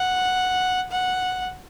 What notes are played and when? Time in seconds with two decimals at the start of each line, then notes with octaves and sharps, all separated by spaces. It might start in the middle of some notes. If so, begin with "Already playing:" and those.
Already playing: F#5
0.91 F#5